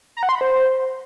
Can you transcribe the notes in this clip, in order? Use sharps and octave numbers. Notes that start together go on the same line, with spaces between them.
A#5
F#5
C6
B5
C5